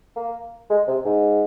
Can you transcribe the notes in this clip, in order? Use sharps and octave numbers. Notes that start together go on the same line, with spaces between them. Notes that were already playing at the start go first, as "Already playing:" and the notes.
A#3
G#3
C3
G#2